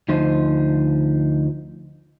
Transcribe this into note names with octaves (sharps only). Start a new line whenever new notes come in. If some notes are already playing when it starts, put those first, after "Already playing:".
D2 F3 D#4 C5